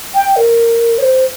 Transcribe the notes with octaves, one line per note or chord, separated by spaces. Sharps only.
G5
A#4
C#5
C5